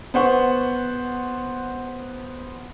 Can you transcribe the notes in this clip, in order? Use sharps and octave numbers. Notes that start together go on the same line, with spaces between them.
B3 C5 F#5 C#6